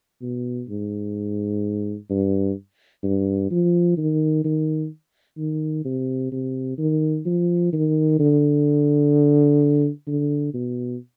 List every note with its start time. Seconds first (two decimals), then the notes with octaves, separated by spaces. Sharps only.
0.22 B2
0.69 G#2
2.10 G2
3.04 G2
3.51 F3
3.98 D#3
4.45 D#3
5.38 D#3
5.85 C3
6.32 C3
6.78 D#3
7.26 F3
7.73 D#3
8.19 D3
10.07 D3
10.54 B2